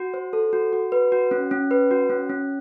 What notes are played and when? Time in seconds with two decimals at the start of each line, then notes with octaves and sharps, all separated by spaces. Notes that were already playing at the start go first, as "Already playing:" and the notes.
Already playing: F#4
0.14 C5
0.33 A4
0.53 F#4
0.73 F#4
0.92 B4
1.12 F#4
1.31 C#4
1.51 C#4
1.71 B4
1.91 F#4
2.10 C#4
2.29 C#4